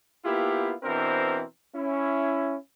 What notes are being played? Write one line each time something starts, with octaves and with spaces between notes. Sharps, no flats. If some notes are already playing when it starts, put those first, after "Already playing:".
A#3 B3 E4 F4 G4
B2 E3 C4 D4 A#4 C5
C#4 E4